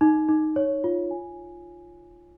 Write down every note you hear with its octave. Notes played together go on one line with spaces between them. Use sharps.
D#4
D#4
C#5
F4
G#5